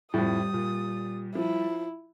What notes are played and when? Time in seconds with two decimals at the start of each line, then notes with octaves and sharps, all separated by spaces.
0.14 F2 A2 G3 D#6
0.54 A#2
1.35 F3 E4